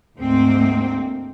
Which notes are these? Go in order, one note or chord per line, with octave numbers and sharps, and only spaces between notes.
D2 G#2 A3 A#3 C4